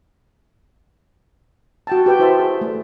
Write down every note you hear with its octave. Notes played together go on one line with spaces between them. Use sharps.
F#4 G5 A5
G4 B4 G5
E4 F#4 C5 E5 A5
G#4
A3